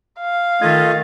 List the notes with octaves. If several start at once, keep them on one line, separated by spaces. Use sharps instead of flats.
F5
D#3 A3 F4 D#5 G#6 A6